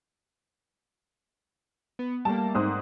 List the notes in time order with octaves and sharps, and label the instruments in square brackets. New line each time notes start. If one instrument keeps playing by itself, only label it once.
[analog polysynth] B3
[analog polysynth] G3 A3 A#3 [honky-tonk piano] A5
[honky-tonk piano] G#2 C4 D#6